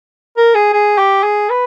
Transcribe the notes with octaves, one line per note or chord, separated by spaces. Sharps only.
A#4
G#4
G#4
G4
G#4
B4